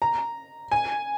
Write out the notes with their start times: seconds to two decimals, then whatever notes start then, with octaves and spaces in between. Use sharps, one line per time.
0.02 A#5
0.71 G#5